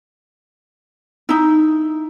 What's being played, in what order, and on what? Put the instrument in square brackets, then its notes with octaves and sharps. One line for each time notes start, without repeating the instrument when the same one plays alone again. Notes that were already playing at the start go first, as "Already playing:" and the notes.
[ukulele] D#4 E4